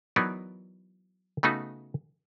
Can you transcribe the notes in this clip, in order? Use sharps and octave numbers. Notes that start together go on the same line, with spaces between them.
E3 F#3 B3 D#4 A#4 D5
C#3 A3 B3 D#4 F#4